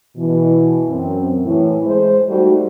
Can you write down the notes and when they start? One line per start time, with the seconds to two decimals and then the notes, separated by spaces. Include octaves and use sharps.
0.17 B2 E3
0.89 F#2 C4
1.45 A2 E3
1.85 G#3 C5
2.29 G3 A3 D#4 F#4